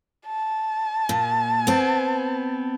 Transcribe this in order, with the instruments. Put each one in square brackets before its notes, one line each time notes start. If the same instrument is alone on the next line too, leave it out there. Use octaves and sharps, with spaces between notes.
[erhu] A5
[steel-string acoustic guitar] A#2
B3 C4